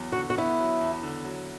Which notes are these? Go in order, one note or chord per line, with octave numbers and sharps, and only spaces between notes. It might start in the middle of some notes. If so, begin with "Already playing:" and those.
Already playing: E2 F#3 B3
F#4
D3
F#4
B3 E4
F#3
E2
D3
F#3